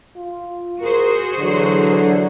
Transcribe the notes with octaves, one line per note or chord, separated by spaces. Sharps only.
F4
F#4 G#4 A#4 C5
D3 E3 F#3